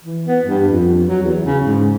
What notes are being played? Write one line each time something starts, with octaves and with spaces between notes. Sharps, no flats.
E3
B3
G2
F2
F#3
E2
C#3
G#2